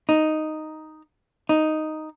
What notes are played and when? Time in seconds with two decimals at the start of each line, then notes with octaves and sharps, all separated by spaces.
0.09 D#4
1.49 D#4